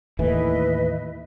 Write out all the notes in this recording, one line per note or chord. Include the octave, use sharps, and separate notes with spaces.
D#2 A2 E3 B4 D#5 E5